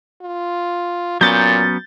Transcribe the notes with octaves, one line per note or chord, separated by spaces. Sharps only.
F4
A#2 F#3 B3 C#4 G6 A6